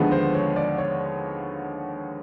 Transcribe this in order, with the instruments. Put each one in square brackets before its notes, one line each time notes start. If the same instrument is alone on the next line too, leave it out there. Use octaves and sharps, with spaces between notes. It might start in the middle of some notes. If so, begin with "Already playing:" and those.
Already playing: [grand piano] D#2 D3 F3 G#3 B3
C5
C#5
D5
C#5